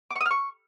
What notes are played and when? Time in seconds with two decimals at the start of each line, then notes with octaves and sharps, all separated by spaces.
0.11 D6
0.16 C#6
0.21 D#6
0.26 F6
0.31 C#6